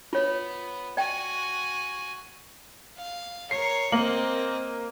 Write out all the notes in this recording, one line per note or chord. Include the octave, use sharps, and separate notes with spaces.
B3 F4 C#5
F#4 D5 G5 G#5
F5
A#4 C#5 C7
A#3 C4 A#4 D#5 F#7